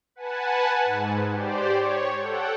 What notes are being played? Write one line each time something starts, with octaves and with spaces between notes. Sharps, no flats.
B4 F#5 G#5 A5
G#2
G4 C5 D5
C#5
A4 F#5 G5